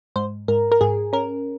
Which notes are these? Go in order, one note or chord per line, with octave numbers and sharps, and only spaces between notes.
G#2 C5
G#2 A#4
A#4
G#2 G#4
C#4 A#4